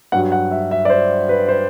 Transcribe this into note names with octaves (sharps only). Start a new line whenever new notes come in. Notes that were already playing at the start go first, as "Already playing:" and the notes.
G2 F#3 F#5
F#5
E5
E5
D5
C5
B4
C5